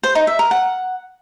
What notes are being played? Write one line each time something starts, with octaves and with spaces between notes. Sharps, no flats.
C5
D#4
E5
A#4
F#5